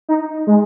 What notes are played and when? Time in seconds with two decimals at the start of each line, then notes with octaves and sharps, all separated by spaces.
0.09 D#4
0.47 G#3